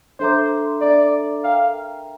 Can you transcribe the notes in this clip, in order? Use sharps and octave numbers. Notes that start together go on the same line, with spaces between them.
D4 A4 C5 E5 A#5 D6
D4 A4 D5 E5 A#5 D6
A#4 E5 F5 G5 A#5